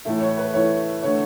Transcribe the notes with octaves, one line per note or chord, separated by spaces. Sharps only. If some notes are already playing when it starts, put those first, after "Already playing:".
A2 E3 A3 E4
C#5
B4
A2 E3 A3 E4 C#5
D3 A3 E4 C#5